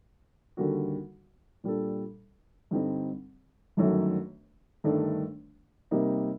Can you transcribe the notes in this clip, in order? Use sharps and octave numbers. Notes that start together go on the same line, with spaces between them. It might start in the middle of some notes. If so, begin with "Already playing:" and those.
D#2 D3 G3 A#3 F#4
A#2 G3 D4 A4
G2 D3 G3 C4 D#4
G1 F#2 D#3 F#3 A3
G1 G2 D#3 A3 D4
C3 G3 A#3 D#4